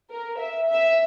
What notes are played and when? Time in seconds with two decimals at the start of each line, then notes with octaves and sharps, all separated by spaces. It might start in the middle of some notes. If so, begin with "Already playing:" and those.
0.11 A#4
0.39 E5
0.69 E5